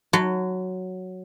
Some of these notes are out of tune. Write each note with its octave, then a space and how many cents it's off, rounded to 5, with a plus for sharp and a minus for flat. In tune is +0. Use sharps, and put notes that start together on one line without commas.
F#3 +0 A5 +0 C6 -45